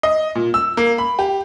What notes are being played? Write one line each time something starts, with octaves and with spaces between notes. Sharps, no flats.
D#5
A#2
E6
A#3
B5
G4